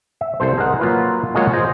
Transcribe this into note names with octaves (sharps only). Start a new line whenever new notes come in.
E5
C2 A4 C5
G#4 A#4 D#5 F#5
F#3 A#3 F4 B4
G#3 A#3 F4 F#4 G#4 C#5
F4 G#4 C5 D#5